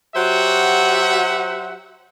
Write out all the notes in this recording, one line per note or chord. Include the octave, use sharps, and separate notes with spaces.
F#3 F#4 G4 C5 E5 F#5